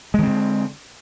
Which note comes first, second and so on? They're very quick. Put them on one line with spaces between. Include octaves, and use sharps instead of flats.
G#3 D#3 C4 D3